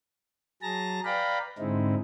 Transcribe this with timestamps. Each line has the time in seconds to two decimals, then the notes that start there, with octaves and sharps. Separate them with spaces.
0.62 F#3 G#4 A5 A#5 A#6
1.05 B4 D5 F5 G5 A#5 B5
1.58 G#2 D3 G#3 C4 D#4 E4